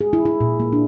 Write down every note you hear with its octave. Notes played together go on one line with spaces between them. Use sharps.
G#4
E4
E4
A#2
A#3
D4